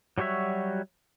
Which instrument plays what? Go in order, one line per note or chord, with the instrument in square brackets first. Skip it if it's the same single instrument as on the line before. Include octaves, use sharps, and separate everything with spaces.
[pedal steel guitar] F#3 G3 F#4 C#5 E5